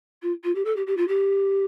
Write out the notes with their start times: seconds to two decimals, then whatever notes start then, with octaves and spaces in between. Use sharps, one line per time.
0.22 F4
0.44 F4
0.55 G4
0.65 A4
0.76 G4
0.86 G4
0.97 F4
1.08 G4